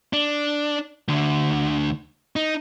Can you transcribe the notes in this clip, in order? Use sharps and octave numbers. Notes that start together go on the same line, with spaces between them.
D4
D2 D3
D#4